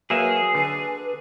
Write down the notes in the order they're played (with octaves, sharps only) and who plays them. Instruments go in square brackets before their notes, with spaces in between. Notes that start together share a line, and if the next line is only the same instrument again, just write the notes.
[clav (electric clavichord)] F#3 A#3 E5 [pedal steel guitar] G#4 [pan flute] B4
[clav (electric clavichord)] D3 [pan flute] B4